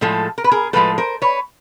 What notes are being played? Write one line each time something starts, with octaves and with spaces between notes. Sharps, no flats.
A2 F3 G#3 A4
A#4
B4
G#4 A#4
A2 F3 G#3 A4 B4
A#4 C5
B4 C#5